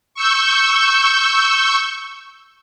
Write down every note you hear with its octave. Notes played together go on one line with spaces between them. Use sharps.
C#6 E6 G6